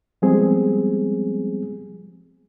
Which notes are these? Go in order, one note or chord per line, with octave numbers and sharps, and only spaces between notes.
F3 G3 G#3 B3 C4 G#4